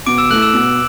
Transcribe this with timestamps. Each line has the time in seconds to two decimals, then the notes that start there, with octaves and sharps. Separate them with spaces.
0.06 B2 D6 D7
0.18 E6 E7
0.30 A3 E4 F#6 F#7
0.42 E6 E7
0.53 B2